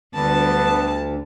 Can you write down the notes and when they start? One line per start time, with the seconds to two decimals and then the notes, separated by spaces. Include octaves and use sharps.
0.15 D2 D3 F#3 G3 B3 A5